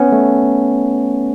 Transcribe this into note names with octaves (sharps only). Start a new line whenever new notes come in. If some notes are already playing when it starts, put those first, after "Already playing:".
Already playing: B3 C#4
A3